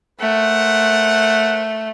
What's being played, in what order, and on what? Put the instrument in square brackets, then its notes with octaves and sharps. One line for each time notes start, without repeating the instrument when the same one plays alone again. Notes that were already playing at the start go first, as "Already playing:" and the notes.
[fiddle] A3 [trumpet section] A#4 C5 F#5